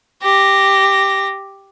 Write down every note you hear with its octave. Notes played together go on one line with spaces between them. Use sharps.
G4 A#6